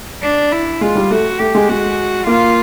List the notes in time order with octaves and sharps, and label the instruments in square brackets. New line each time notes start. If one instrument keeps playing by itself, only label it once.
[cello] D4
E4
[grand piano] G#3 [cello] F4
[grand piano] G3
[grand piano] A3 [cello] F#4
[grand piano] A3 [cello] G4
[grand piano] G#3
[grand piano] G#3 [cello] F#4
[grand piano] A#3 [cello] F4